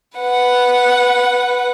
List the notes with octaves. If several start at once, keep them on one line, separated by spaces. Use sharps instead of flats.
B4 F#5